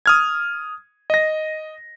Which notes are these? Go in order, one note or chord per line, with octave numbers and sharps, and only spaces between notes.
D#6 F6 G#6
D#5 A#6